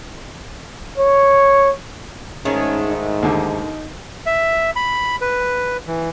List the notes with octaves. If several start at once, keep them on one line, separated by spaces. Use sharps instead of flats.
C#5
G#2 D#3 G#3 A3 C#4
D#4
D#2 D3
E5
B5
B4
E3